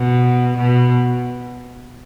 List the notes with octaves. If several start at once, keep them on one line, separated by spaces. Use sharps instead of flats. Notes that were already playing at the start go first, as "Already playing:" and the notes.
Already playing: B2
B2